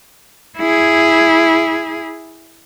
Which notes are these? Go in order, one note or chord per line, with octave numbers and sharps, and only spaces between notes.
E4 G#4